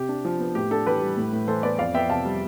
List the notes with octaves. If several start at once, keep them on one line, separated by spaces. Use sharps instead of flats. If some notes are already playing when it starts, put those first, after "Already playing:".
Already playing: C3 G4
D4
F3
B3
A2 G4
D4 A4
E3 G4 B4
G3
A2
A2
E3 A4 C5
B3 B4 D5
F2 D5 F5
B3 E5 G5
C3 F5 A5
G3